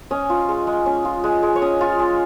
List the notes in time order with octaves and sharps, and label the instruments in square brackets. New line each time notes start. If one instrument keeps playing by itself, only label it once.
[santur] C#4 D#5
F4
G#3
G#3
C#4
F4
G#3
G#3
C#5
C#4 D#5
F4
G#3